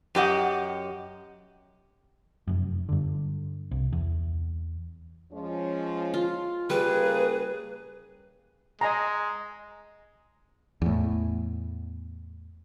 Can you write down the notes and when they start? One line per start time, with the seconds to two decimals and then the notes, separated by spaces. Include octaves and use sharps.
0.15 F#2 G4 D#5 F#5
2.47 F1 F#2
2.89 G2 D3
3.71 C2
3.93 E2
5.32 F3 G#3 C#4
6.14 F4
6.70 C#3 G3 A#3 G#4 B4
8.81 G#3 D#5 G#5 A#5
10.82 E2 A2